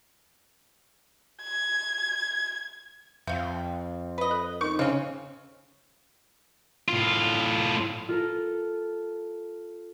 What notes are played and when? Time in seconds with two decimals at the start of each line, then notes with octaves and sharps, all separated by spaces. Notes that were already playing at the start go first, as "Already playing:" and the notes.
1.43 G#6
3.27 F2 C4 E5 F5
4.18 B4 D#5
4.31 A4
4.61 D#4 A#4 C#6
4.79 C#3 C4 C#4 D#5
6.88 A2 F4
8.09 F4 A4 A#4